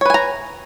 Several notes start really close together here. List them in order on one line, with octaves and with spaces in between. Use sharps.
C#5 B4 G#5 A#5